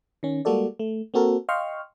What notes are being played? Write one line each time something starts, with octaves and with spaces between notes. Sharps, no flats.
D#3 C#4
G3 G#3 A#3 F#4 A4 D5
A3
A#3 C4 F#4 A4 A#4
D#5 F5 G5 C6 C#6 F6